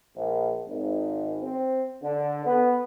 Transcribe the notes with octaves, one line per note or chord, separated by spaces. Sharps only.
A#1
G#1
C4
D3
B3